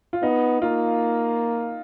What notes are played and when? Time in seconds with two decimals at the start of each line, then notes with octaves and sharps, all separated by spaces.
0.13 F4
0.22 B3 D#4
0.61 A#3 F4